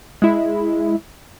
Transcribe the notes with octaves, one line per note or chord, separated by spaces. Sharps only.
G#3 E4